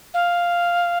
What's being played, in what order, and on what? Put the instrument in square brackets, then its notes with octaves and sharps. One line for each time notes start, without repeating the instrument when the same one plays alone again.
[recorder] F5